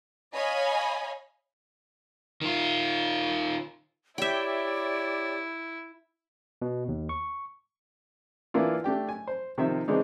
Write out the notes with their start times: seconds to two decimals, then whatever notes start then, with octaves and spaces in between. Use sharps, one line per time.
0.34 C#5 D#5 F5 G#5 B5
2.41 D#3 F4
4.18 E4 G4 C#5 D5 E5 G5
6.62 B2
6.88 D#2
7.09 C#6
8.54 E3 A#3 D4 E4 F4
8.84 A3 D4 G4 G5
9.09 G#5
9.28 C5
9.58 C3 D#3 F3 C4 E5
9.88 C#3 E3 G#3 C4 D4 D#4